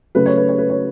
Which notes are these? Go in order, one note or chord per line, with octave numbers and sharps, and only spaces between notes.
C#3 F#3 A3 B4
C#5
B4
C#5
B4
C#5